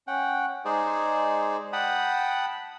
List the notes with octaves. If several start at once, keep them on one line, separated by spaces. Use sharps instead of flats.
C#4 F#5 G5
G#3 D#4 G#4 C5 D5
F#5 G5 A5 B5 D#6